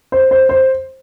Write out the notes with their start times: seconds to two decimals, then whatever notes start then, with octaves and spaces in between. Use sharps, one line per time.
0.12 C5
0.31 C5
0.49 C5